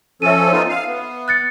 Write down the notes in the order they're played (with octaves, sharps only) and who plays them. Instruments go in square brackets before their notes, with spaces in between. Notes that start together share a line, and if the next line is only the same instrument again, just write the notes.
[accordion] F3 C#4 A4 [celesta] E5 D#7
[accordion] B3 D#4 F4
F5
B3
[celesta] F#6 A6 C#7